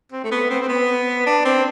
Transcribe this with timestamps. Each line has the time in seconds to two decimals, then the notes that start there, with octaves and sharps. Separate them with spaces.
0.12 C4
0.24 A3
0.31 B3
0.50 C4
0.61 C4
0.68 B3
1.26 D4
1.45 C4